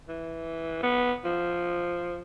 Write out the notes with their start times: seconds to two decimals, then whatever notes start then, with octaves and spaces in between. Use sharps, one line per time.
0.08 E3
0.83 B3
1.24 F3